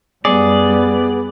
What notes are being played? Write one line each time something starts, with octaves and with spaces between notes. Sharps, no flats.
F#2 G3 B3 G#4 D5